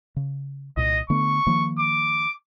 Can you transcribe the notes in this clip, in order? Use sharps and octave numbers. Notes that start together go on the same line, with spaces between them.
C#3
C2 A#2 D#5
D3 A3 B3 C#6
D#3 F3 A#3
D6